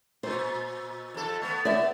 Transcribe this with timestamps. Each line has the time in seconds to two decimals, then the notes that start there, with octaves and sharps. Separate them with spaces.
0.23 A#2 C5
1.14 F2 A4
1.41 A3 B3
1.65 B3 D5 E5